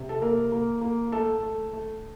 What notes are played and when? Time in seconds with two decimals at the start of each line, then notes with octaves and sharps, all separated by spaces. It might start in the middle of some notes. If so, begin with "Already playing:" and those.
Already playing: C3
0.09 A4
0.21 A#3 A#4
0.52 A#3
0.81 A#3
1.12 A3 A4
1.43 A3
1.73 A3